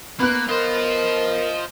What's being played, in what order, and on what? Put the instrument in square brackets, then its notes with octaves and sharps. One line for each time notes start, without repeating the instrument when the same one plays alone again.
[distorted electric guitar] A#3 [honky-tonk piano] B3 F#6
[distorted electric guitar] F4 C5 [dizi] A#4 [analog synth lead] D#5